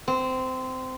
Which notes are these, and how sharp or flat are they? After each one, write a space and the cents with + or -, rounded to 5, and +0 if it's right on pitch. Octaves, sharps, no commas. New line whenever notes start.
C4 -20